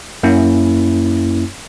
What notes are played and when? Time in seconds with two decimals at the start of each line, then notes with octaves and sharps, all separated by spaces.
0.23 F#2 A#3 C#4 E4